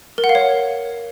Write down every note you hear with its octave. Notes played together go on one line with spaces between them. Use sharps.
A#4
F#5
F5
C#5